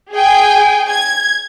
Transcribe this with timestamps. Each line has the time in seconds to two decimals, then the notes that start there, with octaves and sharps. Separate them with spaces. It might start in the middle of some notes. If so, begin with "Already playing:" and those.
0.13 G#4 G5 G#5
0.89 G#6